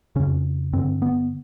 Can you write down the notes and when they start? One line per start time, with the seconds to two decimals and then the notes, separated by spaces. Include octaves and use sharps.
0.16 F2 C#3 C#4
0.73 G2 D3 C4
1.02 B3